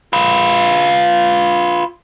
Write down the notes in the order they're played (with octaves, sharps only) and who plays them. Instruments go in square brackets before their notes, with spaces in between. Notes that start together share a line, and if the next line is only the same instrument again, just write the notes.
[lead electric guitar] F4 B4